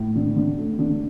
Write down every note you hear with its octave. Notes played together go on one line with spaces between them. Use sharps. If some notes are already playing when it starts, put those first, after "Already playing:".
Already playing: A2
D3
D3
A3
D3